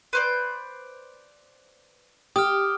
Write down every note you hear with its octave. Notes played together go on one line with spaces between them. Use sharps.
B4 C5 D5
G4 D#6 F6